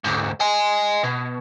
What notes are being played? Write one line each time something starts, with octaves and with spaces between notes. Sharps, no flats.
D2 G#2
D#5 G#5
B2